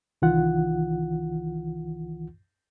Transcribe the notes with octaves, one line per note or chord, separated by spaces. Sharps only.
C2 D#3 E3 F4 F#5